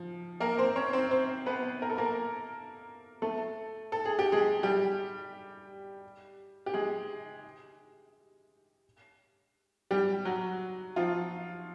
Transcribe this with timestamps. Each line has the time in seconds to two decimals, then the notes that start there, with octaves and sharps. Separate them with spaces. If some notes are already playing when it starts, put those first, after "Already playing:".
Already playing: F3
0.40 A#3 A#4
0.58 C4 C5
0.76 C#4 C#5
0.93 C4 C5
1.11 C4 C5
1.46 B3 B4
1.82 A#4
1.90 A4
1.98 A#3 A#4
3.22 A3 A4
3.92 A4
4.05 G#4
4.19 G4
4.32 G#3 G#4
4.63 G3 G4
6.66 G4
6.74 G#3 G#4
9.91 G3 G4
10.25 F#3 F#4
10.96 F3 F4